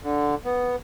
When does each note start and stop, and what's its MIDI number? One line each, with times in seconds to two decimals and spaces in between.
0.02 0.35 50
0.45 0.76 59